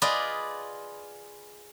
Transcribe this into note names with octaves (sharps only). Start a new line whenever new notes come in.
F4 G#4 B4 D5 D#5